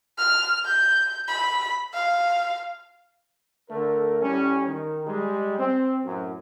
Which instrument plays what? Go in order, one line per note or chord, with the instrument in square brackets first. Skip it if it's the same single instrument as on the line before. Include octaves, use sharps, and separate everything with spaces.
[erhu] F6
G6
B5
F5
[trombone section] D3 A3 A#4
A2 G3 C#4
D#3
G3 G#3
C4
F#2 A2